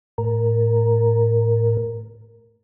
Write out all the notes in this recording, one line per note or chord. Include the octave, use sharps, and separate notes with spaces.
A2 A#4